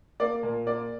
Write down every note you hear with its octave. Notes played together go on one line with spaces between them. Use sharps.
A#3 D5
A#2
A#3 D5